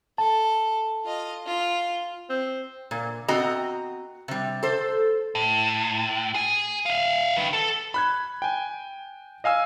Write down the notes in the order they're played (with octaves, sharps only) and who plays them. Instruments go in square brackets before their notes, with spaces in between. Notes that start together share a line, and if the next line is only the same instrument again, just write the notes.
[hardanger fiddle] A4 [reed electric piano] A5
[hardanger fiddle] F4 D#5
F4
[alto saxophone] C4
[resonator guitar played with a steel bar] A#2
B3 C4 F#4 D#5 A#5
C3 G3
A4 C5
[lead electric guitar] A2
G#4 G#5
E5 F5
D#3 B4
A4
[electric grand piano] B5 F#6 G#6
G5 G#5
D#5 F5 G#5 E6